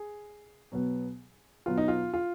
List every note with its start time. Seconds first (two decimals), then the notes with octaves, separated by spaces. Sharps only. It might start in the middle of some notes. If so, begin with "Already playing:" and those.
Already playing: G#4
0.72 B2 F#3 B3
1.66 B2 F#3 B3 F4
1.78 D#4
1.88 F4
2.14 F4